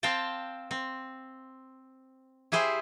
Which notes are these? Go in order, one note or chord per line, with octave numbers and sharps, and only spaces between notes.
C4 C5 F5 G5 A5
C4
E4 G4 G#4 C5 E5